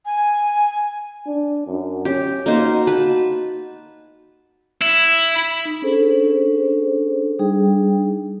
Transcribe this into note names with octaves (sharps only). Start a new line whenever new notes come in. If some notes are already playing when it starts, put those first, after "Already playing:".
G#5
D4
F#2
C#4 G4
A#3 D#4 F#4 C5
B4 A5
E4
D#4
C#4 D4 G#4 A4 C5
G3 D4 D#4 G#4 G5